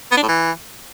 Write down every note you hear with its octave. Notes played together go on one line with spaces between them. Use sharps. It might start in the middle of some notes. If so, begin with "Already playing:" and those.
B3
D4
A2
E3